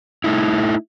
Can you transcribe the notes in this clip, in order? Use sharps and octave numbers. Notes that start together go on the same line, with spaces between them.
A3 D#4 E4